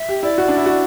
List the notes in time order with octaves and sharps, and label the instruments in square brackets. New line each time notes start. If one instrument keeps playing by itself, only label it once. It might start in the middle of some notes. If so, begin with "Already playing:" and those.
Already playing: [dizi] E5
[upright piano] G4
[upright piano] E4 [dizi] D5
[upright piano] F#4
D4
E4
F#4